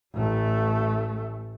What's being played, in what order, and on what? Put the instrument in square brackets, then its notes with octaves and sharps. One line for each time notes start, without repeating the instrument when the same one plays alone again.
[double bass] A1 A3